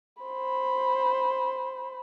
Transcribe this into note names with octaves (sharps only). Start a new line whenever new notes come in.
C5 B5